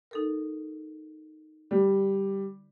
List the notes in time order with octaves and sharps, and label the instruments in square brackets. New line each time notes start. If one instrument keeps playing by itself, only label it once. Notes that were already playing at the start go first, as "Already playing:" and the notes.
[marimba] D#4 A4 A#4
[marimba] D3 [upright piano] G3